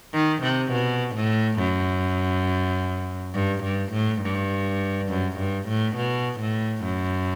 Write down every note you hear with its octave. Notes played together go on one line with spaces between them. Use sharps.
D#3
C3
B2
A2
F#2
G2
G2
A2
G2
F#2
G2
A2
B2
A2
F#2